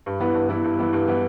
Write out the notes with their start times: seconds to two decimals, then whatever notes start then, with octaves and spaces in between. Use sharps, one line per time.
0.06 G2
0.20 E3 B3 E4
0.34 G2
0.49 E3 B3 E4
0.64 G2
0.79 E3 B3 E4
0.93 G2
1.08 E3 B3 E4